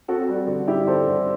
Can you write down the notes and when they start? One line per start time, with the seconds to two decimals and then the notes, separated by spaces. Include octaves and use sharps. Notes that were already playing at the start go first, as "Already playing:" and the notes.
0.08 C4 F#4 A4
0.28 G3
0.47 D3
0.67 G3 E4 G4
0.87 G3 A4 C5
1.07 D3